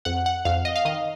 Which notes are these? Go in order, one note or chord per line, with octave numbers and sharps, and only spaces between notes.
F2 F#5
F#5
F2 F5
D#5
F5
D#3 D#5